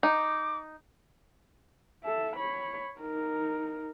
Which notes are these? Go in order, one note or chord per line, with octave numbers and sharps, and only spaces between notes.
D#4 D6
A4 E5
C#5 B5
D#4 A#4